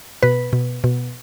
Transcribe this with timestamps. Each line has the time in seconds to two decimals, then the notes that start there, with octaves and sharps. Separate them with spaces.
0.23 B2 B4
0.53 B2
0.84 B2